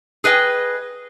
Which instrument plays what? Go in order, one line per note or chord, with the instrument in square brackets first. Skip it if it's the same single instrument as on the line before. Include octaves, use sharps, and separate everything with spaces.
[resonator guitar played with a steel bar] G#4 B4 D#5 G5